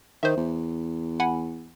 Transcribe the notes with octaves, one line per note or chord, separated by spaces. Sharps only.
D#3 C5 E5
E2
F#5 G#5 B5